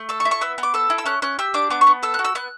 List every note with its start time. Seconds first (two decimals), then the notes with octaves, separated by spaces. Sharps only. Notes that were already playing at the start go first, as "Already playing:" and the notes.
Already playing: A3
0.09 A4 E6
0.20 C#6
0.25 E4
0.31 C#6
0.41 B3 E6
0.58 B3
0.63 D6
0.74 A4 E6
0.90 E4
0.98 E6
1.06 C#4 F#6
1.22 C#4 F#6
1.39 G4 E6
1.54 D4 D6
1.70 B3 D6
1.81 C#6
1.87 B3
2.03 A4 E6
2.14 F#6
2.19 F#4
2.24 E6
2.35 B3 F#6